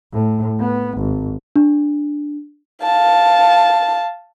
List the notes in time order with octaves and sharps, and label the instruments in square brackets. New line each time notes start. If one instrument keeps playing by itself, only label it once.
[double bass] A2
B3
G#1
[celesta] D4
[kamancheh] F5 A5